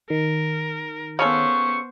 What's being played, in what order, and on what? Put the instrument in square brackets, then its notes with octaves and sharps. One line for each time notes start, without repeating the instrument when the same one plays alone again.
[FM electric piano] D#3 [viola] A#4
[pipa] C#3 C#4 A4 [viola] B3 C5 [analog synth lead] C#6